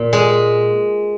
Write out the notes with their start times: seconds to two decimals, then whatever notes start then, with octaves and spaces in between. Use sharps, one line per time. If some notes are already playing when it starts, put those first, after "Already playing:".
Already playing: A#2
0.13 G#3